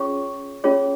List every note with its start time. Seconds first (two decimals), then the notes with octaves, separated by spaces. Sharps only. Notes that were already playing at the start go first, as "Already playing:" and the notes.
Already playing: C#4 F4 G#4 C#5 C#6
0.64 C#4 F4 G#4 C#5